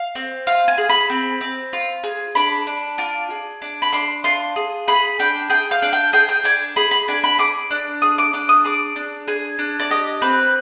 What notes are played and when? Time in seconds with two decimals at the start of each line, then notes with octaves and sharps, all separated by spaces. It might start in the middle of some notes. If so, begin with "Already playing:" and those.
Already playing: F5
0.15 C4
0.47 F4 F5
0.68 G#5
0.78 G#4
0.89 B5
1.10 C4
1.41 C4
1.73 F4
2.04 G#4
2.35 D4 B5
2.67 D4
2.98 F4 D6
3.30 G#4
3.62 D4
3.82 B5
3.92 D4 C6
4.24 F4 C6
4.56 G#4
4.88 G#4 B5
5.19 D4 G5
5.50 G#4 G5
5.71 F5
5.82 D4
5.93 G5
6.13 G#4 G5
6.29 G5
6.44 D4 G#5
6.76 G#4 B5
6.91 B5
7.08 D4 G#5
7.24 B5
7.39 G#4 D6
7.71 D4
8.02 G#4 D#6
8.18 D6
8.33 D4 D6
8.49 D#6
8.64 G#4 D6
8.96 D4
9.28 G#4 G#5
9.59 D4
9.80 D5
9.90 G4 D#5
10.22 C4 B4